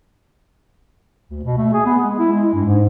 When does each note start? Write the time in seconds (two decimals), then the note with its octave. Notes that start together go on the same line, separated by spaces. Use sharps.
1.30 D2
1.44 B2
1.58 A3
1.73 G#4
1.86 B3
2.02 G#3
2.19 E4
2.32 G#3
2.54 G2
2.66 G#2